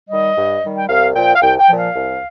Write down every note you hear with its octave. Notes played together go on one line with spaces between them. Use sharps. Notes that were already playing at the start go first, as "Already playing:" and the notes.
D#3 G3 D#5
G2
D#3 G3
G5
C2 F5
A#2 F3 G5
F5
C2 G5
G5
A#2 F3
F5
C2